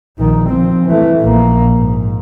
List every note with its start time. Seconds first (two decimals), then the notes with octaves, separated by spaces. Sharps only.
0.18 A#1 D#3
0.50 F3 C4
0.86 E3 A3
1.20 A#1 A#3
1.78 G#2